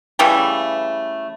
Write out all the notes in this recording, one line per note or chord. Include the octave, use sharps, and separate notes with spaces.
C#3 E3 G3 A3